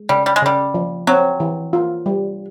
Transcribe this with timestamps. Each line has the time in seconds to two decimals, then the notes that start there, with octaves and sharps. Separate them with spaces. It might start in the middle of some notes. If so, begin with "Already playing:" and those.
Already playing: G#3
0.09 C#3 G3
0.26 G3
0.36 G#3
0.42 C#3 G3
0.74 F3
1.07 F#3 C4
1.40 E3
1.73 F4
2.06 G3